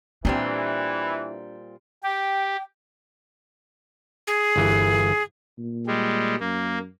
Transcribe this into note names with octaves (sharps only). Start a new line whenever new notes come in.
A#2 E3 G3 C4 D4
G4 G5
G#4
G1 E3
A#2
G3 G#3
F#2 A#3